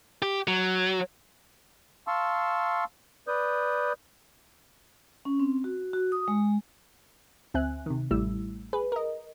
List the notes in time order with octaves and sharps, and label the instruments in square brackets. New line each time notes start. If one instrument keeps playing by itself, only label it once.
[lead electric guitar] G4
F#3
[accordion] F5 A5 C6 C#6 E6
B4 D5 D#6 G6
[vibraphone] C#4
C4
F#4
F#4
D#6
G#3
[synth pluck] D2 C4 E5 G#5 F#6
C3 D#3
A1 G3 A3 E4 E6
G#4 B4
A#4 D#5